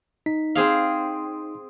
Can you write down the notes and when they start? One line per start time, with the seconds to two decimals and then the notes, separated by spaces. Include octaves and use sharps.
0.26 D#4 B6
0.55 C4 G#4 F5